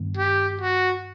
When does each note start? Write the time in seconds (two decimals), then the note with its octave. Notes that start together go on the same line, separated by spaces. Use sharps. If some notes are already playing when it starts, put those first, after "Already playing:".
Already playing: G2 D#3 G3 B3
0.17 G4
0.62 F#4